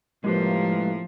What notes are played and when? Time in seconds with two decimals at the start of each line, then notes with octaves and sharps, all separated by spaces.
0.24 A2 C3 F3 G#3 A#3 G4 B4